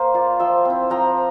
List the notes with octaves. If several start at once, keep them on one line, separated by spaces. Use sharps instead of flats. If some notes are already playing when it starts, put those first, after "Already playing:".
Already playing: A#3 C5
F4 D5 F5
F3 E5 G5
C4 E4
F3 G5 A#5